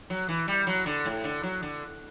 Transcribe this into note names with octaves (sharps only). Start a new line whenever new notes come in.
F#3
E3
G3
F#3
D3
A2
D3
F#3
D3